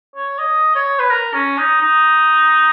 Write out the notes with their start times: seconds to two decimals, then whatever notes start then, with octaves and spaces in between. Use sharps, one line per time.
0.16 C#5
0.39 D#5
0.75 C#5
0.99 B4
1.10 A#4
1.33 C#4
1.58 D#4
1.80 D#4